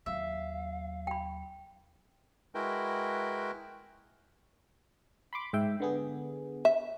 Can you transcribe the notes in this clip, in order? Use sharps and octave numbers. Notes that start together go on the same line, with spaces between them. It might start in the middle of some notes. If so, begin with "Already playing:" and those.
D#2 F#3 E5 F5
G5 B5
G#3 E4 F#4 A#4 B4 G5
B5 C6 D6
G#2 E5 G5
D3 B3 G#4
E5